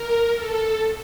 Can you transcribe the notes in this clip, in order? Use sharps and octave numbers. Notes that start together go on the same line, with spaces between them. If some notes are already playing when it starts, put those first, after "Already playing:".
Already playing: A#4
A4